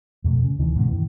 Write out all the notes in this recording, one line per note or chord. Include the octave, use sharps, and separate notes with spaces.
F2 B2 A3
C#3
D2 C3 D#3 E3
G#2 B2 D3
F#2 A#2 D#3 E3